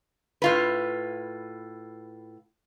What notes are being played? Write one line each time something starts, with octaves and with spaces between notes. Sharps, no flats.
A2 F4 B4